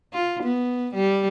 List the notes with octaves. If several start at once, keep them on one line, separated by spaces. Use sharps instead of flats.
F4
B3
G3